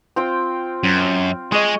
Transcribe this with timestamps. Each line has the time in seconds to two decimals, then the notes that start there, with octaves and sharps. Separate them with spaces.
0.16 C4 F4 G5
0.83 F#2
1.52 G#3 G#4 C#5 D#5